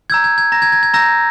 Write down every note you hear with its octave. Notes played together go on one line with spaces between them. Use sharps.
A#5 E6 G6 G#6
G#6
G#6
A#5 A#6
G#6
G#6
G#6
A#5 E6 G6 A#6